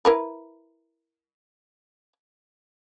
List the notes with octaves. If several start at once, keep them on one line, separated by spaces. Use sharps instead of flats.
E4 A#4 B4